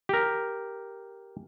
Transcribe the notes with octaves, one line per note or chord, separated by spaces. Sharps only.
G4 A#4